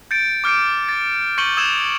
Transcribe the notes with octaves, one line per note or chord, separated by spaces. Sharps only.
G6 A6 C#7 D7
D6 F6 G6 C#7 D7
A6
C#6 G6 C#7 D#7 F#7 G7
D#6 E6 G#6 E7